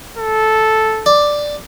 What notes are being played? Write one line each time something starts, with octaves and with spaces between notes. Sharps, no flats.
A4
D5